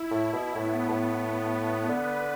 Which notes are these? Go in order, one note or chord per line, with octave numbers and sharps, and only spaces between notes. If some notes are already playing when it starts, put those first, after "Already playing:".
Already playing: E4
A2
B2
A2 B3
A2
D3 B4